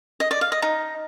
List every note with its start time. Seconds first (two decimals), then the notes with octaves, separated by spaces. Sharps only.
0.20 D#5
0.31 D5
0.41 F5
0.52 D#5
0.62 D#4